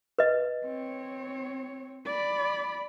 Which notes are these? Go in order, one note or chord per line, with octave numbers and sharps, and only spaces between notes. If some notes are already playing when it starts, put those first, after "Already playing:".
B4 D#5
C4 C#5
D5 B5